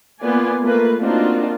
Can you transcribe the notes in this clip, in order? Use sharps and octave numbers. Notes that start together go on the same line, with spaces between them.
A#3 B3 F4 B4 D5 G#5
A3 A#3 F4 B4
A#3 C4 D4 D#4 F4 F#4